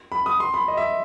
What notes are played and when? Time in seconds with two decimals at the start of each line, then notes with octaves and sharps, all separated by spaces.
0.12 B5
0.26 D#6
0.40 C6
0.54 B5
0.68 D#5
0.77 E5